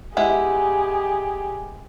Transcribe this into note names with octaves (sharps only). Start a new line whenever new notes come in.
G#3 B3 E4 G4 G#4